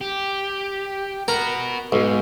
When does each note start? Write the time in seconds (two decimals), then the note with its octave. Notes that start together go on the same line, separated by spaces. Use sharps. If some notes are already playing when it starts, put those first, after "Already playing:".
0.01 G4
1.28 F#4 A#4 B4 A#5
1.92 B1 G#2